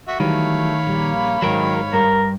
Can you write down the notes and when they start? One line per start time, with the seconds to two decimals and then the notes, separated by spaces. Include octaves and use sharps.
0.08 F#4 E5 C#6
0.20 D#3 E3 F#3 G3 A3 C#5 F5 B5
0.87 A#1 G3 A#3
1.42 G#1 G#2 D#3 F#3 A#4
1.93 G2 A#4